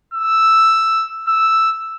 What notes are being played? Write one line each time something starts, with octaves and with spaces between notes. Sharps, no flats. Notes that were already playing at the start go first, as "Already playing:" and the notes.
E6
E6